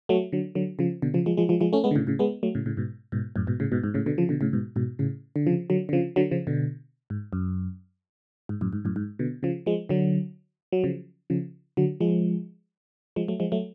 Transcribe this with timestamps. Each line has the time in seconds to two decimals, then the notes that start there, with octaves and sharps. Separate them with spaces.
0.09 F#3 A3
0.32 D3 F#3
0.55 D3 F#3
0.79 C#3 F3
1.02 B2 D3
1.14 C#3 F3
1.26 F3 G#3
1.37 F3 G#3
1.49 F3 G#3
1.61 F3 G#3
1.73 A3 C#4
1.84 G#3 B3
1.91 D3
1.95 A2 C#3
2.07 A2 C#3
2.19 G#3 B3
2.43 F#3 A3
2.55 A2 C#3
2.66 A2 C#3
2.77 G#2 B2
3.12 G#2 B2
3.36 F#2 A2
3.47 G#2 B2
3.60 A2 C#3
3.72 G#2 B2
3.83 G#2
3.94 A2 C#3
4.06 B2 D3
4.18 C#3 F3
4.29 B2 D3
4.41 A2 C#3
4.53 G#2 B2
4.76 G#2 B2
4.99 A2 C#3
5.36 D3
5.47 C#3 F3
5.70 D3 F#3
5.89 D3
5.93 C#3 F3
6.16 D3 F#3
6.31 C#3 F3
6.47 B2 D3
7.10 G#2
7.33 F#2
8.49 G#2
8.61 F#2 A2
8.73 G#2
8.85 F#2 A2
8.96 G#2
9.19 B2 D3
9.43 C#3 F3
9.66 F3 G#3
9.89 D3 F#3
10.72 F#3
10.84 C#3 F3
11.30 C#3 F3
11.77 D3 F#3
12.00 F3 G#3
13.16 F3 G#3
13.28 F#3 A3
13.40 F3 G#3
13.52 F#3 A3